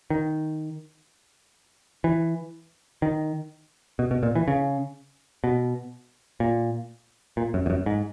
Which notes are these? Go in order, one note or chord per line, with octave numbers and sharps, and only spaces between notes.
D#3
E3
D#3
B2
B2
A#2
E3
C#3
B2
A#2
A#2
F#2
E2
F#2
G#2